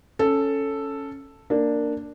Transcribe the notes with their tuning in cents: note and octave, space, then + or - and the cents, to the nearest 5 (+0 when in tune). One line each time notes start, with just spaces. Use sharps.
C#4 +0 A4 +0
A#3 -10 D4 +0 D5 +0